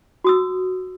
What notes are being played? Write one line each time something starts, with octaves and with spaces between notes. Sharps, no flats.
F#4 D#6 E6